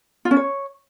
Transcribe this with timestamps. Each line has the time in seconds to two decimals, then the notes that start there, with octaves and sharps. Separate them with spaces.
0.25 F4
0.31 C#4
0.37 C#5